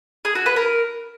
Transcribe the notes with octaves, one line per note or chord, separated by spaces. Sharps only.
G#4
F#4
B4
A#4